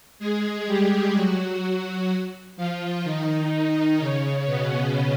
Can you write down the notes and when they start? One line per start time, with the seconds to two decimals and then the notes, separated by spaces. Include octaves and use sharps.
0.19 G#3 G#4
0.67 G3 G4
1.14 F#3 F#4
2.57 F3 F4
3.04 D#3 D#4
3.99 C#3 C#4
4.46 B2 B3